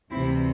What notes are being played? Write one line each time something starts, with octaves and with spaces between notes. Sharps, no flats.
D2 C3 E3 C4 E4